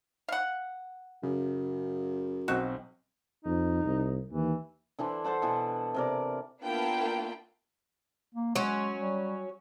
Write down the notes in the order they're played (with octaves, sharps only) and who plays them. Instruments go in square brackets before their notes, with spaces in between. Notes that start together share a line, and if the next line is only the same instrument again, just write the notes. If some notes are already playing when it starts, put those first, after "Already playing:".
[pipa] F5 F#5
[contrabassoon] F#2 [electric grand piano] C#3
[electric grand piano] B1 C4 D#5 [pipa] F#4
[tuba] F2 [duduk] D#4
[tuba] C2
[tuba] D#2 [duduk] E3
[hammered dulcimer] D3 E3 D4 C5
A4 C5 F#5 A5
B2 E3
C3 A#4 D5
[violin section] A#3 B3 D4 E4 F4 G5
[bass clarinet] A#3
[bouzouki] F#3 C#4 [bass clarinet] G#3
[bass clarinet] G3